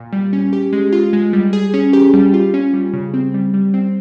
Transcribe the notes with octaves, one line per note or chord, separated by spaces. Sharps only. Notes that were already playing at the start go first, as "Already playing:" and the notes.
Already playing: A#2
G3
C#4
G4
G#3
F4
G#3
G3
G#4
C#4
G4
G3
F4
C#4
G3
C#3
C4
G3
G3
C4